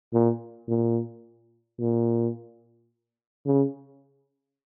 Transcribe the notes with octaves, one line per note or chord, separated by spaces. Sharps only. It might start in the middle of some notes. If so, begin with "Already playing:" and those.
A#2
A#2
A#2
C#3